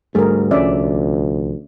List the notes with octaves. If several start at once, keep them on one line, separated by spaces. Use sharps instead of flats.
D2 G#2 G3 A3 G#4 A#4
C2 F3 C#4 D5 E5